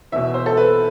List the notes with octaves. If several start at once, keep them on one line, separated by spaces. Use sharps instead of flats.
E2 B2 E5
C5
A4
B4